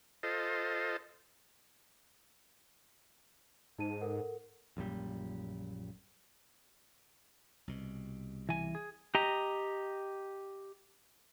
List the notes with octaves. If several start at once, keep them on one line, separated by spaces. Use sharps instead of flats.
F4 A4 C5 D#5
G#2 D#4 A5 D#7
A4 A#4 F#5
A#1 F#2 A#2 G3
C2 B2
E3 G#5
G#4
G4 D#5 A#5